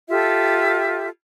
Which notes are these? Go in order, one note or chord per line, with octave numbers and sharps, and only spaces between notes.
F4 G4 A4 E5